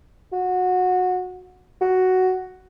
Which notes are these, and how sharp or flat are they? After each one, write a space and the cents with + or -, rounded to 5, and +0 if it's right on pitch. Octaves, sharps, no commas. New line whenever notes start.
F#4 -20
F#4 +5